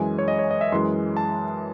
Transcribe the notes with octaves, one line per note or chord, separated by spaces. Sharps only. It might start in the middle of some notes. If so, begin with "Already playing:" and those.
Already playing: F#2 E3 G#3 G#5
C#5
D#5
C#5
D#5
E5
F#2 E3 G#3 C6
A5